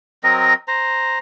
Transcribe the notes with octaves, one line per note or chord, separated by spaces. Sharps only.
F#3 C4 A#4 D#5
C5 A#5